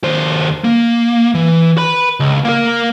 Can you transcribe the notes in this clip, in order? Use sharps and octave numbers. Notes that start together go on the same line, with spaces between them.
D#2 C5
A#3
E3
B4 B5
C#2
A#3 A#4